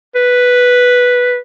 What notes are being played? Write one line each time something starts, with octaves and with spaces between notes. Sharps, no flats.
B4